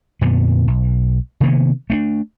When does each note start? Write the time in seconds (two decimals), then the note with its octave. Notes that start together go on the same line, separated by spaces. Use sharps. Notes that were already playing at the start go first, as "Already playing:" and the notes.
0.21 F2 A#2 D3 B3
0.68 B1
1.40 C3 D#3 A#3 B3
1.90 A3 B3 D4